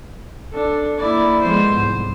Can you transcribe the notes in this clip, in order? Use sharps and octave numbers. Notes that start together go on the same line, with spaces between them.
D4 A4
A#3 E4 D5
F3 G#3 B3 C5
C2 G#2